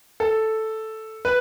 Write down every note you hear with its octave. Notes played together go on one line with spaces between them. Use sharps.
A4
B4